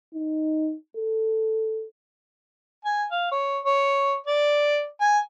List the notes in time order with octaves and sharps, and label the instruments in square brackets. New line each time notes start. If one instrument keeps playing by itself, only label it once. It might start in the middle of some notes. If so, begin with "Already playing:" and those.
[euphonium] D#4
A4
[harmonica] G#5
F5
C#5
C#5
D5
G#5